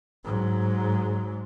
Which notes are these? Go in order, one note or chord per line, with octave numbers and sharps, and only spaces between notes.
G#2 F#3